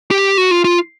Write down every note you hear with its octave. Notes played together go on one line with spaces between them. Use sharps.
G4
F#4
F4
F4